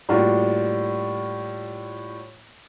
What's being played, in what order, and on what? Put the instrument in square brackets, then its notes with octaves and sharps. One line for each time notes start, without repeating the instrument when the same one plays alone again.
[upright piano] A2 G3 A#3 D4 F4 F#4